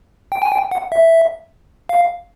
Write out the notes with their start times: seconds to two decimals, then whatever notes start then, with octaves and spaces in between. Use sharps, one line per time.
0.32 G5
0.42 G#5
0.52 G5
0.71 F#5
0.92 E5
1.89 F5